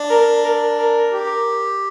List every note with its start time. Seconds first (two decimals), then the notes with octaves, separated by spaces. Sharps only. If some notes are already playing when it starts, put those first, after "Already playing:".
Already playing: D4
0.10 A#4
0.44 A#4
0.77 A#4
1.11 G4